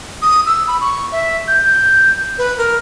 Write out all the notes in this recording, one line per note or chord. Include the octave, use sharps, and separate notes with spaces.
D#6
E6
B5
C#6
E5
G6
B4
A#4